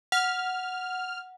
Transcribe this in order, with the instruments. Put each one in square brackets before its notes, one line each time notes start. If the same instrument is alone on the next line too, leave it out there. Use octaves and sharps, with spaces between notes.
[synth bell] F#5 [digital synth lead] F6